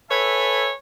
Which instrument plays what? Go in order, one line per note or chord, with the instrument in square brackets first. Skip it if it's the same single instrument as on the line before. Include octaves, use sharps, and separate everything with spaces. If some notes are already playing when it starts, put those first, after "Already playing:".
[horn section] A4 B4 C#5 E5 G#5